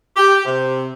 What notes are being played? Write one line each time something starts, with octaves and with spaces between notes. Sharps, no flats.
G4
C3